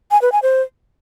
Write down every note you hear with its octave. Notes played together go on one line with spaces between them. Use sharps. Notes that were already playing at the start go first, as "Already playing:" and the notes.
G#5
B4
G#5
C5